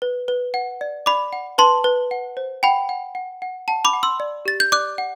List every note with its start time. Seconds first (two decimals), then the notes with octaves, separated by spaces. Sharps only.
0.02 B4
0.28 B4
0.54 F#5
0.81 D5
1.06 D5 B5 D6
1.33 F#5
1.58 B4 A5 C6
1.84 B4
2.11 F#5
2.37 C5
2.63 F#5 G5 B5
2.89 F#5
3.15 F#5
3.42 F#5
3.68 F#5 A5
3.85 B5 D6
3.93 F#5
4.03 C6 E6
4.20 D5
4.45 G4 A6
4.60 G6
4.72 D5 D6 F#6
4.98 F#5